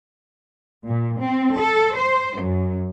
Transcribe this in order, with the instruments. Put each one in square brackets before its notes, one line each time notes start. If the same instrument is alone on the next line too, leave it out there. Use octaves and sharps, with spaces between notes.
[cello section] A#2
C4
A4
C5
F#2